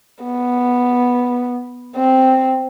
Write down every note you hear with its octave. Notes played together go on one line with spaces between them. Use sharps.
B3
C4